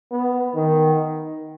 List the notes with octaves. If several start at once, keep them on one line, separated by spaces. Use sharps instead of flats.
B3
D#3